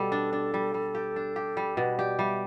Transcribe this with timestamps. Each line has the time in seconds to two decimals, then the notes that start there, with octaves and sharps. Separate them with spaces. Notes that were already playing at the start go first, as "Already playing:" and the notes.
Already playing: B2 G3 A4
0.12 D4
0.33 D4
0.54 G3
0.74 G3
0.95 G4
1.16 D4
1.36 G4
1.57 G3
1.77 B2 B4
1.99 G4 D5
2.19 G3 E5